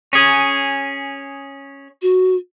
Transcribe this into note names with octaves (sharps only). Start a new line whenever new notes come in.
C#4 G#4
F#4